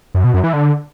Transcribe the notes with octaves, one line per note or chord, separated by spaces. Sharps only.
F#2
B2
F#2
E3
D3